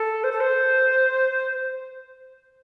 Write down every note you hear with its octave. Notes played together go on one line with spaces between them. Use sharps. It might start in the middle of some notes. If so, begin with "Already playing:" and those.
Already playing: A4
C5
A4
C5